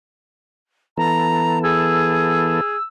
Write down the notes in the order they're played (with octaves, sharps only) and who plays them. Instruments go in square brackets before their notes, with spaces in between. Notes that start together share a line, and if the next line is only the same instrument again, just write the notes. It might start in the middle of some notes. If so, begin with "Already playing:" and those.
[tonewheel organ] E3 B3 A4 [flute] A#5
[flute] G#4 [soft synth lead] E6